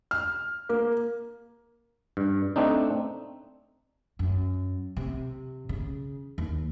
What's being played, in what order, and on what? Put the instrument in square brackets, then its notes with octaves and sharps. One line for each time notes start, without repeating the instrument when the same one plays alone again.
[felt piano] F6
A#3
[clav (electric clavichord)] G2
A3 C4 D4 D#4
[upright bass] F#2
C3
C#3
D#2